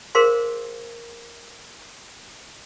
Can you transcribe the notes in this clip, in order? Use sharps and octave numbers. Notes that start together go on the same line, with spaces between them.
G#4 A#4 C5 F5 C6